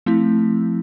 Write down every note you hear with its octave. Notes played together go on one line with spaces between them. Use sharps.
F3 A3 C4 E4